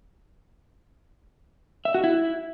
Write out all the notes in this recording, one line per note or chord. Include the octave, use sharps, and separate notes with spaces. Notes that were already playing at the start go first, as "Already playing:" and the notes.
E5
F#4
E4